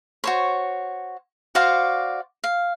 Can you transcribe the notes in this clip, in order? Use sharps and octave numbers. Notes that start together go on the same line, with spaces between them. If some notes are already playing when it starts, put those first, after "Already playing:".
F#4 C5 C#5
F#4 C5 D5 F5
F5